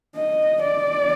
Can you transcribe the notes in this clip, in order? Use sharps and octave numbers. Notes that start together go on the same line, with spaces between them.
D#5
D5